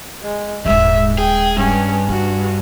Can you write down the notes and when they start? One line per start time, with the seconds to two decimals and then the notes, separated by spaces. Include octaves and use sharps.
0.22 G#3
0.65 D#1 D#2 G#2 G#3 E5
1.18 G#4 G5
1.57 G2 C#4
2.09 D4 F#4